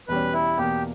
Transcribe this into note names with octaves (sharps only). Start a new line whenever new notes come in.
E2 B2 G3 C#4 B4
E4
E2 B2 A#3 G4